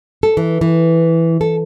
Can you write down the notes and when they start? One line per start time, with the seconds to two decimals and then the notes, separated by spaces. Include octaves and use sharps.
0.23 A4
0.37 E3
0.61 E3
1.41 A4